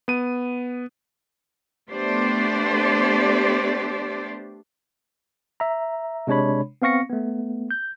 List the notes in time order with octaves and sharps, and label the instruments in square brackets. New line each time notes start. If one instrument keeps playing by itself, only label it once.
[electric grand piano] B3 D#7
[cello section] A3 B3 D4 G4 C5 D5
[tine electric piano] E5 A#5
C3 G#3 D4 C#5 B5
B3 C4 F5 C#6 A#6 C#7
A3 B3
G6